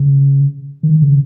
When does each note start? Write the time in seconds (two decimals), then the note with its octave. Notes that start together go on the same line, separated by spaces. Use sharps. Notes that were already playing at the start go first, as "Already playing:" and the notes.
Already playing: C#3
0.83 D#3
1.02 C#3